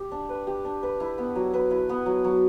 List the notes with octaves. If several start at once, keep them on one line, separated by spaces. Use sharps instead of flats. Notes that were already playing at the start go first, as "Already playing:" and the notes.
Already playing: G4
D4
B4
G4
D4
B4
E4
B3
F#3
B4
E4
B3
F#3
F#3